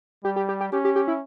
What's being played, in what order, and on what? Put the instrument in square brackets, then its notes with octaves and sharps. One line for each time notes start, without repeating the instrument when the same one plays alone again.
[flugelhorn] G3 [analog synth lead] G4
[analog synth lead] G4
G4
G4
[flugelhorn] C#4 [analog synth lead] G4
[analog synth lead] G4
G4
E4